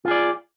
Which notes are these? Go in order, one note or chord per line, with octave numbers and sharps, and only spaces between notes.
F4 G#4 D5